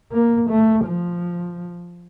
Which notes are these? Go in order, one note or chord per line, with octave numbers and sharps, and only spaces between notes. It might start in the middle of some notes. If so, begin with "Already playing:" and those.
A#3
A3
F3